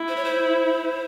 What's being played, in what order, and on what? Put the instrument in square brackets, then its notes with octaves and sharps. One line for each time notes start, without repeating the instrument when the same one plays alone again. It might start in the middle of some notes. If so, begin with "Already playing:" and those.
Already playing: [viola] E4
[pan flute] C5
C#5
C5